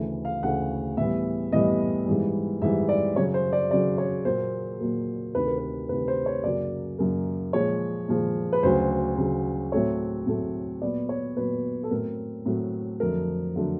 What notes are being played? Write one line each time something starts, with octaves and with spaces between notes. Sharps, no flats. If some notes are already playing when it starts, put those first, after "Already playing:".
Already playing: D2 C#3 E3 A3
F5
D2 C#3 E3 A3 F#5
A2 E3 G3 B3 E5
A2 E3 G3 B3 D#5
G#2 E3 G3
G#2 E3 G3 E5
D5
F#2 C#3 F#3 C#5
C5
D5
F#2 C#3 F#3 D5
C#5
A#2 F#3 A#3 C5
A#2 F#3 A#3
D2 C3 D#3 B4
A#4
B4
D2 C3 D#3 B4
C5
C#5
F#2 C#3 F#3 A#3 D5
F#2 C#3 F#3 A#3
A#2 F3 G#3 C#5
A#2 F3 G#3
B4
D2 C#3 F#3 C5
D2 C#3 F#3
A2 F#3 A3 C4 C#5
A2 F#3 A3 C4
A#2 F#3 B3 D5
C#5
A#2 F#3 B3 B4
A4
A2 F#3 A3 C4 A#4
A2 F#3 A3 C4
F2 D3 F#3 A3 A#4
D3 F#3 A3